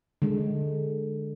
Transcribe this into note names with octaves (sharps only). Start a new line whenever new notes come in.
D3 G#3